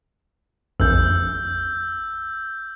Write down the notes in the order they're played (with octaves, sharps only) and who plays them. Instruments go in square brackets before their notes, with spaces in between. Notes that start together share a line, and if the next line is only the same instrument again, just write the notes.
[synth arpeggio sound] A#1 F2 [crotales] E6 F6 G6